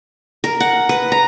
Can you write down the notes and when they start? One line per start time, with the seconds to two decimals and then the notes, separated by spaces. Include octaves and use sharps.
0.44 A#4
0.60 F#5
0.89 B4
1.12 A#5